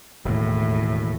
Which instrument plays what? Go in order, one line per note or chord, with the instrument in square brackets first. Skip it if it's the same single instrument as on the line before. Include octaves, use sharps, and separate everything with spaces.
[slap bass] E1 D#2 [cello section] A2